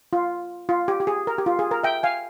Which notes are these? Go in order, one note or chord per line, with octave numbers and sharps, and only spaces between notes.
F4
F4
G4
G4
G#4
A#4
G4
F4
G#4
A#4
E5 G5
F5 G#5